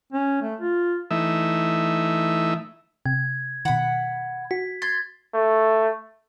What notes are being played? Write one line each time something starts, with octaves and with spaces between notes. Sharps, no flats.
C#4
A3
F4
E3 A3 D#4 E5
C3 G#6
B2 D#3 F#5 B5
F#4 B6
C6 G#6 A6
A3